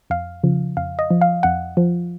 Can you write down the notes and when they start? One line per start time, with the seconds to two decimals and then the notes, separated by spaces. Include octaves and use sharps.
0.10 F2 F5
0.43 C#3 F3
0.77 F2 F5
0.99 D#5
1.10 F3
1.21 F5
1.43 F2 F#5
1.77 F3